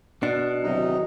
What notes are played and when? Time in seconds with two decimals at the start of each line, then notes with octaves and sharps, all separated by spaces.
0.23 B2 D4
0.63 E2 C3 D#3 F#3 D#4